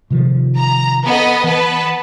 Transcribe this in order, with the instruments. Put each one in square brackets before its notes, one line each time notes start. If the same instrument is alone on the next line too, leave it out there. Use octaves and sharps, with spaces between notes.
[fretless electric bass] C3 D#3 F3
[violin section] A#5
B3 A4 D#5
[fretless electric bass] E3 [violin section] B3 B4 A5